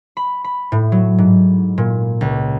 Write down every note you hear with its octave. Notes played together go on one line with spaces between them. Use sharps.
B5
B5
A2
F#3
G#2
A#2
C#2